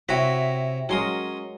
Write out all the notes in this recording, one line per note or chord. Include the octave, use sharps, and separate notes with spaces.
C3 E4 F#4 C#5 G5 A#6 B6
F#3 G#3 C#4 A#4 C6 D#6